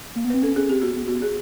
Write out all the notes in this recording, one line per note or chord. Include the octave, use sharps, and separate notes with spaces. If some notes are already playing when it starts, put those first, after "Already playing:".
A#3
B3
C4 B4
C#4 A4
C#4 G#4
C4 G4
B3 F#4
B3
B3 F#4
G#4